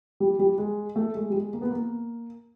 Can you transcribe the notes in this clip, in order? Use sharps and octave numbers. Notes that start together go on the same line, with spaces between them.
G3
G3
G#3
A3
G#3
G3
G#3
A#3
B3
A#3